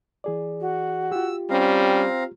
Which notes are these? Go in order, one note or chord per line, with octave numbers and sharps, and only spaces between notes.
E3 G#4 D5
F#4
F4 G4 E6
G3 C4 C#4 F5 A#5